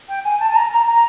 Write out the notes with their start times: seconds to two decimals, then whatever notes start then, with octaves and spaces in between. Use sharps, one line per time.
0.08 G5
0.24 G#5
0.40 A5
0.50 A5
0.56 A#5
0.71 A#5
0.87 A#5